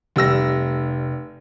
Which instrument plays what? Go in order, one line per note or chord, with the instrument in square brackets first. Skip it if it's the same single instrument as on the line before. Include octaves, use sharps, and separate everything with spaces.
[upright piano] F1 G3 E6 A#6